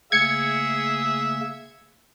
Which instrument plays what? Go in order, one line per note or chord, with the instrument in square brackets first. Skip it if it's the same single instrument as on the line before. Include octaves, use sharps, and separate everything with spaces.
[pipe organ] C#3 A3 A#3 [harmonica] G#4 E5 [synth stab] G#6 C#7